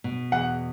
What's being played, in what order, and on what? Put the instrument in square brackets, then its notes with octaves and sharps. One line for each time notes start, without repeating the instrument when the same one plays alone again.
[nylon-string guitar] B2
[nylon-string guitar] E2 [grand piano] F#5